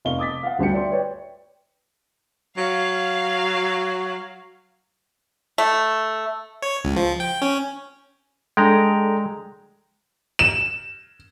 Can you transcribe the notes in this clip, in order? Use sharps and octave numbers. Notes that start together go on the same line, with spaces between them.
F1 D#5 F5 C#6 G7
D6 D#6 A6 B6
F5 F#5
D2 G3 D4 G4 E5 C#7
D5 E5 G5 C6
B4 C#5 D5 G5
F#3 F5
A3
C#5
C#2
F3
G5
C#4
G#3 D4 G#4 A4 G5 A#5
E7